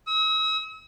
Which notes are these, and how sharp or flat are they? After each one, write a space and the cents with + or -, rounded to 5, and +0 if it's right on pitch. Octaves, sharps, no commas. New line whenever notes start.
E6 -45